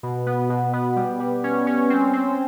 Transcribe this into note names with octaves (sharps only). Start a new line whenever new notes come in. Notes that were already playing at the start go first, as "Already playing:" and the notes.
B2
B3
B2
B3
G3
G3
C#4
C#4
C4
C4